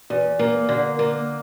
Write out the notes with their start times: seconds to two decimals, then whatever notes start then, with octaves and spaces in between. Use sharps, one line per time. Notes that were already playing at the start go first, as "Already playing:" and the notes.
0.10 E2
0.39 A#3
0.69 D3
0.99 A#3